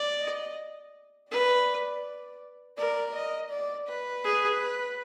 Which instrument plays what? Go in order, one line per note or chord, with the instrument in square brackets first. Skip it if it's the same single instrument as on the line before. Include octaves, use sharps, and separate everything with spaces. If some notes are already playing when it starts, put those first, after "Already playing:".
Already playing: [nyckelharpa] D5
[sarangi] D#5
[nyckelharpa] B4 [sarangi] D5
[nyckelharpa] A#4 [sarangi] D5
[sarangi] D#5
D5
B4
[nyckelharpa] G#4